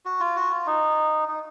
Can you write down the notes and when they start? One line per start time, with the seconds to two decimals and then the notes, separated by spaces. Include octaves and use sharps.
0.05 F#4
0.20 F4
0.36 F#4
0.51 F4
0.67 D#4
1.28 D#4